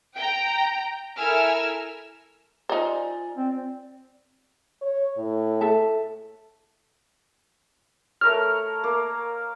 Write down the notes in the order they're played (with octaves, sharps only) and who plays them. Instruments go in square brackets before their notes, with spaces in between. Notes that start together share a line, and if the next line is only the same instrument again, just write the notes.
[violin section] G5 A#5
E4 A4 A#4 G#5 E6 F6
[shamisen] D#4 C5 [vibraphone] F4 G#5 [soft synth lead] D5
[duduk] C4
[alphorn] C#5
A2
[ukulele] A4 E5 A5
[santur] A3 A#4 C#5 [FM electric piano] F6
[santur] A#3